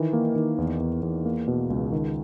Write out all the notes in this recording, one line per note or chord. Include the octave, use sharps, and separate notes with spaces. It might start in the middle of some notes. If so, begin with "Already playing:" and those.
Already playing: D#3 E3
A#3
D#3
E2
E2
E2
A#3
B2
C#2
D#3